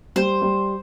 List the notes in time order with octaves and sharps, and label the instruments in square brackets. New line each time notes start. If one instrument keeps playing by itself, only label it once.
[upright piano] G3 [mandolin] C5
[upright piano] G3